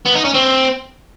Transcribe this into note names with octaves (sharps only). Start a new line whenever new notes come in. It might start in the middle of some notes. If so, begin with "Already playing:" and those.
B3
D#4
C#4
C4